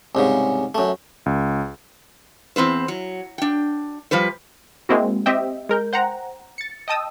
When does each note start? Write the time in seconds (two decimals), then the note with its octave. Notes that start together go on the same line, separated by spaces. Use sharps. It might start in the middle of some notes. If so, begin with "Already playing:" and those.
0.15 C2 G#2 C#3
0.75 F#2 A3
1.26 C#2
2.56 E2 C4 B4 C5
2.88 F#3
3.38 D4 G5
4.11 F3 G3 B4 C5
4.89 G#3 A#3 C4 E4 F#4
5.26 C4 G4 D#5 E5 G5
5.69 G#3 A#4 G6
5.93 C5 F#5 G5 A#5
6.58 A6 C#7
6.88 D#5 G5 A5 D#6 E6